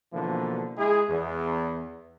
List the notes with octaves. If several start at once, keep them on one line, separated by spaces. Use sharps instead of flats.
B2 D3 E3 F3 A#3
G#3 E4 G#4
E2